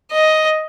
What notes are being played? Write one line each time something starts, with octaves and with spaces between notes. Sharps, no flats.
D#5